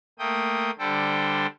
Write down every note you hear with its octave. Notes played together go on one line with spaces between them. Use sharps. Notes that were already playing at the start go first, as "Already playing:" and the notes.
A3 A#3 G5 D#6
D3 G3 A4 C5 G5